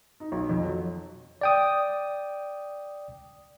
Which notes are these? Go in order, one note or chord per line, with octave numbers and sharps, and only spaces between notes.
D#4
B1
F2
F#3
D5 G5 D#6